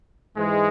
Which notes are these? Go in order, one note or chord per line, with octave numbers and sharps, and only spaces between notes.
G#2 E3 G#3